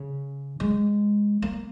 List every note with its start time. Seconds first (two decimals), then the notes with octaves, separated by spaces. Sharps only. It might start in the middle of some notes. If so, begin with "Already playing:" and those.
Already playing: C#3
0.60 G#3
1.42 A#3